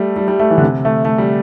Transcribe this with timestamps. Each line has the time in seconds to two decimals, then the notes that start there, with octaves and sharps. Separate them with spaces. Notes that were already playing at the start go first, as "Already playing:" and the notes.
Already playing: G3 A3
0.16 G3
0.28 G3
0.39 A3
0.51 E3
0.58 D3
0.63 C3
0.85 A3
1.05 A3
1.18 G3